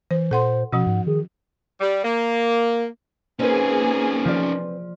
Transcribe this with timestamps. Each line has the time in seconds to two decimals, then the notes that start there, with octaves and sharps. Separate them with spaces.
0.11 E3 C5
0.31 A#2 A4 C5 F#5 C6
0.72 B2 F3 C#4 F#4 F#5
0.87 G#2
1.07 D#3 G#4
1.81 G3
2.04 A#3
3.39 A#3 C4 C#4 D#4 G#4 B4
4.25 F3 F4 D5